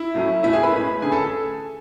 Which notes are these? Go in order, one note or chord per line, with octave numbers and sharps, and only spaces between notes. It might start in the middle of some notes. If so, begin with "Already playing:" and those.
Already playing: E4 E5
A2 F#3 A3 C#4
B2 A3 C#4 E4 E5
G#4 G#5
B4 B5
A2 G#3 C#4
D3 A3 C#4 G#4 G#5
A4 A5